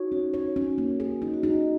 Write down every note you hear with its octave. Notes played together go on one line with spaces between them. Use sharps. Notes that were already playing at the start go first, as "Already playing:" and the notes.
Already playing: D#4 F#4 C#5
C#4 F#4
C#5
C#4
A#3
G#4
D#4
F#4
D#4 G#4